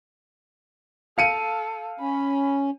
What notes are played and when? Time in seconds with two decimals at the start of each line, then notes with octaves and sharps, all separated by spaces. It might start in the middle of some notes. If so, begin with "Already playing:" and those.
1.18 A4 F5 C#7 D#7
2.00 C#4 B5